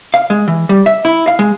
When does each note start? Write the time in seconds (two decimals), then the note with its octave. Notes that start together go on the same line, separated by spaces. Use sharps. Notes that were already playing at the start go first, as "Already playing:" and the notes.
0.14 F5
0.30 G#3
0.48 E3
0.69 G3
0.86 E5
1.05 E4
1.28 F5
1.39 G#3